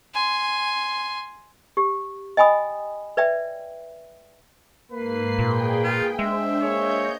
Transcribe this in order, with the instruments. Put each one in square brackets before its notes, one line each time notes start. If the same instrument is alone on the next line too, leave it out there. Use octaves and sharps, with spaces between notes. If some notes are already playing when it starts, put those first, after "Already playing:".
[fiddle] G#5 C6
[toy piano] G4
D#5 G5 G#5 B5 D#6
B4 D5 E5 G5
[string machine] G#2 C7 [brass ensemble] A#3 B4
[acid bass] A#2 [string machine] G#4 G5
[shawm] F4
[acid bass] G#3 [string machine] D4 C5 [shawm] E5
[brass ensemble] A#3 G#4 C#5 [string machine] D#5 G6